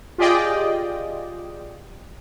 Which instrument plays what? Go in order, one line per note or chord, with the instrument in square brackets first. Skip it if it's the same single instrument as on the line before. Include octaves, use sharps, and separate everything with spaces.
[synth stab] F4 G4 G#4 D5 D#5 G5